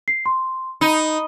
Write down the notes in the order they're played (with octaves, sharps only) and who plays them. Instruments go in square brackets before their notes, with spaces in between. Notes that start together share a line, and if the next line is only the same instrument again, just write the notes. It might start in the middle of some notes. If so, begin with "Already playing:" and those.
[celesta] C7
C6
[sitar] D#4 [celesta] B5